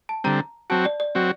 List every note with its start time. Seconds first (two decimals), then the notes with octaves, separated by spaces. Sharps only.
0.09 A5
0.24 D3 G3 C4 A#5
0.70 F#3 C4 F#4 A5
0.85 D5
1.00 D5
1.15 F#3 C4 F#4